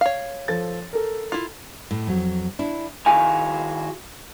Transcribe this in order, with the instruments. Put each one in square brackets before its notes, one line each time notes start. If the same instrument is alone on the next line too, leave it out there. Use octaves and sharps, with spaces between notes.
[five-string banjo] C#5 F5
[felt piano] F3 A4 A6
A4 A#4
[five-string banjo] E4 F4
[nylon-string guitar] A2
F2 F#3
D4 E4
[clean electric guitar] D#3 E4 F#4 G#4 F5 G#5